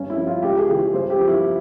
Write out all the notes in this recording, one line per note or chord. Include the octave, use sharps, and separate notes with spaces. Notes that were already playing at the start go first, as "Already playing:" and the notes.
Already playing: G2 C#4
E4
F3
F4
C#2 G4
G#4
C#3 E3 G4
G2 C5
G4
F3
E4